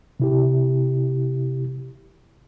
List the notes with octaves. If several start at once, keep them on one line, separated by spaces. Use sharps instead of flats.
C3 E4 G4